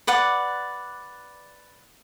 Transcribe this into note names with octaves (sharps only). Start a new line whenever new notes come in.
B4 D5 F#5